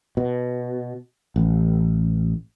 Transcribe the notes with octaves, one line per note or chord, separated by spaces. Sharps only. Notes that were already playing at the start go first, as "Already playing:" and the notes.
B2
A1